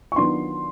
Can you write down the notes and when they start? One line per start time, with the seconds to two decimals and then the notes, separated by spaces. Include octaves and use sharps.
0.12 C#6
0.16 D#3 F#3 B3 D4 F4 C6